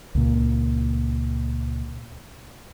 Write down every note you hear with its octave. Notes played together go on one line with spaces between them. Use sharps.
C#2 A#2